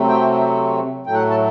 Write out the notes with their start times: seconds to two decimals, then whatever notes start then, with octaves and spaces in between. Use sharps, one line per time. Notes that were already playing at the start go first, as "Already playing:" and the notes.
Already playing: C3 F#3 A3 C4
0.09 G5
1.06 A2 F#3 A3 G5
1.14 F#5
1.30 A5